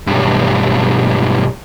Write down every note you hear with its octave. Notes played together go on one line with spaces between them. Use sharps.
B1 G2